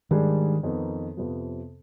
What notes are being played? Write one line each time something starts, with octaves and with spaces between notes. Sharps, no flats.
G#2 D#3 G3 D4 G#4
F2 D#3 B3 D#4
F2 C3 F3 B3